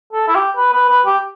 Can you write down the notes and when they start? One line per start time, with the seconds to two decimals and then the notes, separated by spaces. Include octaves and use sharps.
0.13 A4
0.28 E4
0.35 G4
0.57 B4
0.73 B4
0.89 B4
1.06 G4